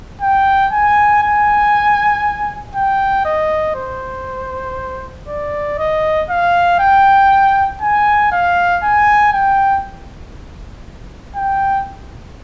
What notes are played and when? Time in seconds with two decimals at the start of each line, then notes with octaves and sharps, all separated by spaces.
0.21 G5
0.72 G#5
1.22 G#5
2.75 G5
3.25 D#5
3.76 C5
5.28 D5
5.79 D#5
6.30 F5
6.79 G5
7.82 G#5
8.32 F5
8.83 G#5
9.33 G5
11.36 G5